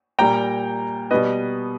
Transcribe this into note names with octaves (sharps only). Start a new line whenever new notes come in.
A#2 G3 G5 A#5
B2 G3 B4 D#5